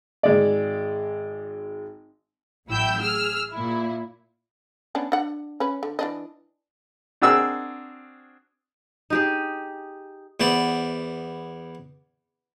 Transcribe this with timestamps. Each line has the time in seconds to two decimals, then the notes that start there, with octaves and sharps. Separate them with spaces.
0.23 G#1 G#3 D5
2.68 A1 F#3 E4 G5 E6 G6
3.01 G#4 E6 F6
3.52 A#2 E4
4.95 B3 C#4 D4
5.12 D4 F#5
5.60 C#4 B4
5.83 D3
5.99 E3 D4 D#5
7.22 C4 D4 F#4 G#4 A#4 E6
9.10 D#4 G4 G#4
10.40 E2 B3 C5 D5